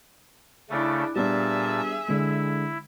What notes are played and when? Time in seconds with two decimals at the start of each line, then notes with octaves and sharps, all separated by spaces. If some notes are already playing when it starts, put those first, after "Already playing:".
0.70 C#3 A3 D4 E4
1.16 A#2 G3 B3 D4 G#4 E5 A5
2.08 D3 G#3 E4